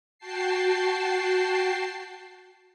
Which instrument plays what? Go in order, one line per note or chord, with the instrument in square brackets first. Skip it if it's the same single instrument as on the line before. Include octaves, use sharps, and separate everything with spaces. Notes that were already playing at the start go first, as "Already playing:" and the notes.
[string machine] F#4 G5 A5 C7